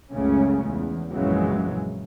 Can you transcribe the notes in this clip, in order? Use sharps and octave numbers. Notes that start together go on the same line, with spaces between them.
C#2 F#2 C#3 A3 C#4
E2
A#1 F#2 C#3 E3 F#3 G#3